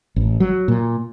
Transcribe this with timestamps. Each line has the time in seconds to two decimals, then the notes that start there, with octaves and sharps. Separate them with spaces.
0.16 A1
0.40 F#3
0.68 A#2